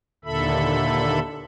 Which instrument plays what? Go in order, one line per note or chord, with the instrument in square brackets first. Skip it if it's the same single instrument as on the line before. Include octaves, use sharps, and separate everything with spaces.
[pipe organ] D#2 A#2 D3 A4 E5 B5